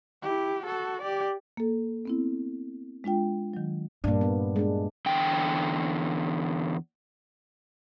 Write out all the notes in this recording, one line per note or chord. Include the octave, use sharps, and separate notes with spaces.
E4 G4
F#4 A4
G4 D5
A#3 A4
B3 C4 E4
G#3 D4 F4 G5
D#3 F#3
G2 A#2 A#3 D4
B3
G#3 D4
E2 D3 G5